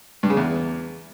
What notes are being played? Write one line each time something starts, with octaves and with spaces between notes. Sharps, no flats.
G2
C#3
E2